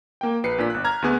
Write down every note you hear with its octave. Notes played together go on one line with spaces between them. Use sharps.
A#3 G5
A#1 B4 C7 C#7
A#2 D4 B6
G1 F#6
A#5 F6 G#6
D2 A3 B3 G#4 F#6